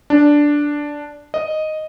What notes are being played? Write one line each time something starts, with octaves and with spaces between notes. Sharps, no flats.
D4
D#5